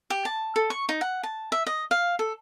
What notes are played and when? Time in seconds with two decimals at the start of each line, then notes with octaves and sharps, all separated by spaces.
0.10 G4
0.25 A5
0.56 A4
0.70 C#6
0.89 D#4
1.01 F#5
1.23 A5
1.52 E5
1.67 D#5
1.91 F5
2.19 A4